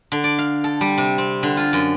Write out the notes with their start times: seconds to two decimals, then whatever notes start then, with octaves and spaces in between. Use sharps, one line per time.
0.12 D3
0.24 D5
0.38 F5
0.64 A4
0.81 G3
0.98 C3
1.18 C4
1.43 D3
1.57 F4
1.73 F#2